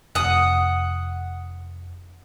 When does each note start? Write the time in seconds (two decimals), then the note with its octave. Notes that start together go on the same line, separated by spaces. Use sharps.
0.15 F1 F#5 D#6